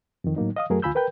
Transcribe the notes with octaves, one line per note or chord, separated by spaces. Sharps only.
F2 D#3
A2 F#3 A#3 D#4
D#5 F5 D#6
F#2 F#3 A3 F#4 G#4 A#4
D2 F4 G#5 B5 E6 G6
A#4 B4 G5 G6